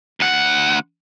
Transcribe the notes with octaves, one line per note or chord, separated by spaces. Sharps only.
D2 F#5